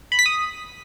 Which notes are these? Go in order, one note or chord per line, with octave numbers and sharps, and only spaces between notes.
B5
B6
D#6